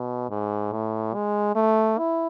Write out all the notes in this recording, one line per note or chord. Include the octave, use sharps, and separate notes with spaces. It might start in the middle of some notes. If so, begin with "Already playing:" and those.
Already playing: B2
G#2
A2
G#3
A3
E4